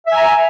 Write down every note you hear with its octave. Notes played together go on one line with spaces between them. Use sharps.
E5 G#5 A#5